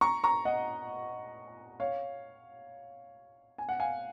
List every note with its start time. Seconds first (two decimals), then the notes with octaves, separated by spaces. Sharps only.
0.01 A#5 C#6
0.24 A#5 C#6
0.45 D#5 F#5
1.80 C#5 F5
3.58 G#5
3.69 F#5
3.80 F5 G#5